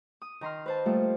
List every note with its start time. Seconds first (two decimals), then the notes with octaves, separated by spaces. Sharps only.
0.22 D#6
0.41 D#3 A#5 C6 F6
0.66 B4 C5 A5
0.86 F3 G3 A3 A#3 F4 E5